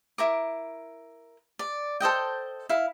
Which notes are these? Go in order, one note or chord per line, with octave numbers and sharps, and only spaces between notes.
E4 A#4 D6
D5
A4 C5 D#5 G5
E4 F5